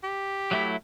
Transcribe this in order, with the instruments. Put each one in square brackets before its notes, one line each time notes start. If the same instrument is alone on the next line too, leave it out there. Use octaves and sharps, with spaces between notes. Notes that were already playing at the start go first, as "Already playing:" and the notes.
[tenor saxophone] G4
[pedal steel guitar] F#3 A3 E4